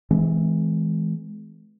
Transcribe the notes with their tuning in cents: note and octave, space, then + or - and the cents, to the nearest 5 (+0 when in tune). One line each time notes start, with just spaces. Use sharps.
E3 -10 G#3 +25 C4 -30